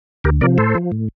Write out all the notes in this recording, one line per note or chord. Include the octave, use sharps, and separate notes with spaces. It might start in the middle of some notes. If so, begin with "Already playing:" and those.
D2 G4 A#4
C3 F3 A#4 D5
A2 A4 C5
F3
A2